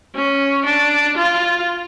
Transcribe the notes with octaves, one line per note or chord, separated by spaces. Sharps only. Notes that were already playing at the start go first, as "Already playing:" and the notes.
C#4
D4
F4